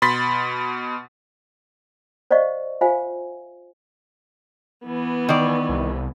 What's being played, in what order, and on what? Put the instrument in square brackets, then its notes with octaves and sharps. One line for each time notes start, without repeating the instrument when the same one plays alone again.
[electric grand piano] B2 B5 C6 A6 B6
[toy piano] C5 D5 D#5 F5 C#6
F4 C5 E5 F5 G#5
[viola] E3 B3
[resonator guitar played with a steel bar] D#3 D5
[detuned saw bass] C2